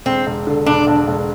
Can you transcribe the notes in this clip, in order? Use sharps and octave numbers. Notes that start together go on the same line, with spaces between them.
E1 C4
E1
D3
E1 D4
E1
E1